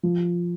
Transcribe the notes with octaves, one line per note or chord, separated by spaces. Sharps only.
F3